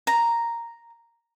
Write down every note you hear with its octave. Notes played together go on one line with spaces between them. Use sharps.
A#5